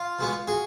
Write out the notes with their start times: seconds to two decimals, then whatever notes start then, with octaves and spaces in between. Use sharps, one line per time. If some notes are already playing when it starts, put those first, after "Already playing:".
Already playing: F4
0.19 B2 G#3 B3
0.47 F#4 G#4